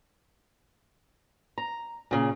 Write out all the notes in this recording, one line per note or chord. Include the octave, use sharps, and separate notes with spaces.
A#5
A#2 C#3